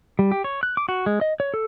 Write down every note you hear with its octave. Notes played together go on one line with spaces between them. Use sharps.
G3
G4
C#5
F#6
D6
F#4
G#3
D#5
C#5
A4